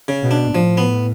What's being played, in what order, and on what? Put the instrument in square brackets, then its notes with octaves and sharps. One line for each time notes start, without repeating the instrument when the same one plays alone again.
[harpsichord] C#3
[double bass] B2
[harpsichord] D4
[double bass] A2 [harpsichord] F3
[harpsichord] B3